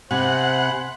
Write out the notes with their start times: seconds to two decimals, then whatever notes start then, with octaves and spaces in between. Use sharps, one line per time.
0.11 C3 C5 F#5 G#5 B5